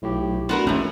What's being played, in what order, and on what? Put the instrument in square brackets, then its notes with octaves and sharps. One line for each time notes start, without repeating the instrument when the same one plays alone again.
[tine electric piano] B1 G4 [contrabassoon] A2
[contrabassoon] D2 [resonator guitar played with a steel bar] B3 F#4 A#4 [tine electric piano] C6
[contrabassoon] C#2 [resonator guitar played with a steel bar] A2 E3 [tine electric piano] A3 [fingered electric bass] C4 C#4